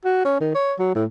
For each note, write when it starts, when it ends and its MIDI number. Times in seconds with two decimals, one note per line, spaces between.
0.05 0.22 66
0.25 0.40 61
0.40 0.53 51
0.55 0.73 73
0.79 0.91 54
0.95 1.05 45